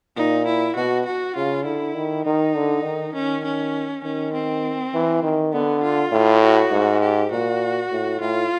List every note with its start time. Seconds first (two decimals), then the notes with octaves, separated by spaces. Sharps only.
0.16 A#2 D#4
0.47 E4
0.76 B2 F#4
1.06 F#4
1.36 C#3 F4
1.65 D3 E4
1.95 D#3
2.25 D#3 D#4
2.55 D3
2.84 D#3
3.14 D#3 C#4
3.44 C#4
4.04 D#3 C#4
4.33 C4
4.93 E3
5.23 D#3
5.53 D3 B3
5.83 F4
6.12 A2
6.42 F#4
6.72 G#2
7.02 G4
7.31 A#2 F#4
7.91 A2
8.20 A2 F4